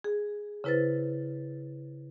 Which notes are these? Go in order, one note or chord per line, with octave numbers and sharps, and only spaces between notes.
G#4
C#3 E4 B4 C5 A6